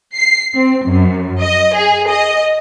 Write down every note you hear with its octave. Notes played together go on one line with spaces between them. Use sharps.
C7
C4
F#2
D#5
G#4
D#5